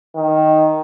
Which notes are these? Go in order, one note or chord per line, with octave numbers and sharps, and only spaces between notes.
D#3